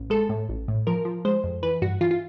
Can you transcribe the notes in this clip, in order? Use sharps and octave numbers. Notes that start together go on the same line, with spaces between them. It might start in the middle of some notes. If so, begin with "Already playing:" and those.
Already playing: A1
G#3 A4
A2
A1
A2
F3 A#4
F3
G#3 C5
F2
E3 B4
G2 F#4
E3 F4
F4